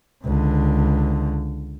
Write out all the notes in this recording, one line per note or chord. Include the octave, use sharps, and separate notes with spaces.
C#2 D3